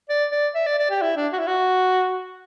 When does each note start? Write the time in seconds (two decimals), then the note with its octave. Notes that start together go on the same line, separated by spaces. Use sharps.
0.10 D5
0.32 D5
0.55 E5
0.66 D5
0.79 D5
0.90 G4
1.01 E4
1.17 D4
1.33 F#4
1.39 E4
1.47 F#4